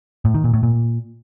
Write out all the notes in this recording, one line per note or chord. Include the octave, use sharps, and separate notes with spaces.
A2
D#3
A#2
A2
A#2